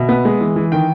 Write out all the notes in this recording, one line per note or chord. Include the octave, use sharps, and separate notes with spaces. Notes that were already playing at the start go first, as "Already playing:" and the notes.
Already playing: B2 E5
B3
G#3
E3
E3
D#3 G5